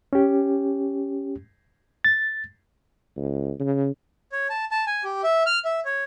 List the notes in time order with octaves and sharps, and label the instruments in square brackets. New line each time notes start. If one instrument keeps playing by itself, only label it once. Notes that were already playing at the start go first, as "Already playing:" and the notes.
[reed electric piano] C#4 G4
A6
[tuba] C#2
C#3
[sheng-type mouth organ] C#5
A5
A5
G#5
G4
E5
F6
E5
C#5